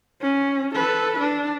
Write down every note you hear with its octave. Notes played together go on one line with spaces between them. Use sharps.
C#4
A4 B4
D4